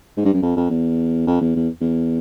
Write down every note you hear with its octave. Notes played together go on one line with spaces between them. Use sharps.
G#2
G2
F#2
F2
F2
E2
F2
E2
E2
E2